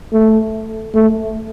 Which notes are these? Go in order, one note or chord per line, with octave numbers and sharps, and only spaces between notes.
A3
A3